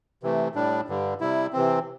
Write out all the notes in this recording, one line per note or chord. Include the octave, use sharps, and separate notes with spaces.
C3 E3 A3
A2 G3 D4
G2 D3 G3
C3 G3 E4
C3 E3 C4